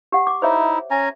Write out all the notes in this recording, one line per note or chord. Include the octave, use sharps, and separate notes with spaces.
G4 F#5
D6
D#4 E4 C5 C#5 E5
C#4 G#5 A#5